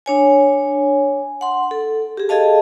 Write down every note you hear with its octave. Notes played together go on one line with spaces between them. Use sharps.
D4 C#5 G#5
F#5 C6
A4
G4 G#4
G#4 A4 D#5 F5 A5